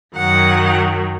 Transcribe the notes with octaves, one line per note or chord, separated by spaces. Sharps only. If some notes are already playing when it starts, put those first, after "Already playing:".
F#2 D#3 F#3 F#5